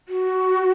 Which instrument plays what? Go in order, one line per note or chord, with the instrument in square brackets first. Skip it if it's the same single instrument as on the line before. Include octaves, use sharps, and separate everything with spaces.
[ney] F#4